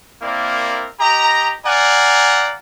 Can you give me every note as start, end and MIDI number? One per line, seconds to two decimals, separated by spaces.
0.22 0.88 58
0.22 0.88 60
0.22 0.88 64
0.22 0.88 70
0.22 0.88 74
0.99 1.55 67
0.99 1.55 75
0.99 1.55 82
1.65 2.56 74
1.65 2.56 77
1.65 2.56 78
1.65 2.56 80
1.65 2.56 82